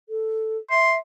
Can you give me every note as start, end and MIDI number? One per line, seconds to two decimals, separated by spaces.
0.09 0.58 69
0.71 0.98 76
0.71 0.94 84